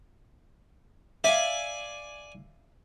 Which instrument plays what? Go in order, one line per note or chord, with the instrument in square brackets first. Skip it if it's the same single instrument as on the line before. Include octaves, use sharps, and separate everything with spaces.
[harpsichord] D5 G#5 [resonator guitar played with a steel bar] E5 F5